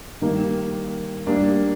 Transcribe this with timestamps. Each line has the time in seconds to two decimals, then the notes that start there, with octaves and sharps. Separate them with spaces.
0.21 D#3 G3 A#3
1.27 G3 A#3 D4